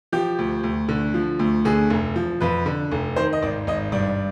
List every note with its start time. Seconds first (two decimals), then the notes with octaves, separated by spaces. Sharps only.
0.12 F3 G4
0.39 D2
0.63 D2
0.89 D3
1.14 F3
1.39 D2
1.65 D3 G#4
1.90 F1
2.16 F3
2.41 F2 B4
2.66 D3
2.92 F1
3.16 D#3 C5
3.33 D#5
3.42 G#1 D5
3.67 G#1 D#5
3.92 G2 D5